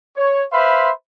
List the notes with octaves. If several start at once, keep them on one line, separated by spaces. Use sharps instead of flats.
C#5
B4 C5 E5 F5 B5 C6